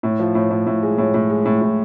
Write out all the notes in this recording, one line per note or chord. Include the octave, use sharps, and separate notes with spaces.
A2
F3
A2
A2
A2
G#3
A2
A2
G#3
A2
A2